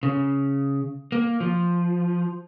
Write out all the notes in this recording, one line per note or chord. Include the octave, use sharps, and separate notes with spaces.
C#3
A#3
F3